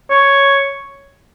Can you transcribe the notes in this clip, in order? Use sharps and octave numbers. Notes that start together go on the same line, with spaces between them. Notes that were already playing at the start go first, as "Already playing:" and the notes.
C#5